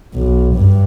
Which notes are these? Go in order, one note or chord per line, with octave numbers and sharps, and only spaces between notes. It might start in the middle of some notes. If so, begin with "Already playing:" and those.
B1
G2